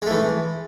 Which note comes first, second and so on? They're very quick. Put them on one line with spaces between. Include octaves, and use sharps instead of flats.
G#3 A3 E3